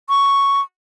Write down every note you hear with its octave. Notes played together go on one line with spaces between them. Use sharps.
C#6